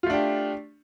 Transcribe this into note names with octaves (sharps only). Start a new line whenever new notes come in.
A3 D4 F4 G4